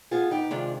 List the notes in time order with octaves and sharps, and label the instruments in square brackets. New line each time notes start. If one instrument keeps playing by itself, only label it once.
[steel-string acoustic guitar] B2 B3 F4 G#4
D#4 G4
C3 D#3 G#3 D4 F4